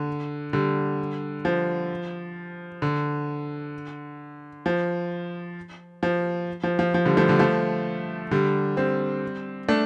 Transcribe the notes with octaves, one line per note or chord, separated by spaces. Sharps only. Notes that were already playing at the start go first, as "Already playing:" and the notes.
Already playing: D3
D3 G3
F3
D3
F3
F3
F3
F3
F3
D3 G3
F3 A3
D3 G3
F3 A3
D3 G3
G3 C4
A3 D4